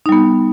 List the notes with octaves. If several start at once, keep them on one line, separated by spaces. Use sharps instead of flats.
G3 B3 D#4